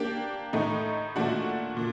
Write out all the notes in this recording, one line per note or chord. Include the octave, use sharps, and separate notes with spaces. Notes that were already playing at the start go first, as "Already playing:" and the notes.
Already playing: A#3 D4 G4
A2 A3 D#4
A#2 A3 D4 F#4
A#2